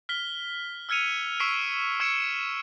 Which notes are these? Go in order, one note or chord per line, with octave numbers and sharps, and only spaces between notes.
F6 B6 G7
E6 F6 G#6 C#7 D#7 F7
C#6 E6 B6 C7 D7
C#6 E6 G#6 C#7 D7 E7